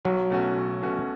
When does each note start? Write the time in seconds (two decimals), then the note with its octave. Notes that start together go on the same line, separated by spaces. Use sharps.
0.05 B1 F#3
0.30 B2 A3 C#4 F#4
0.57 B1
0.83 B2 A3 C#4 F#4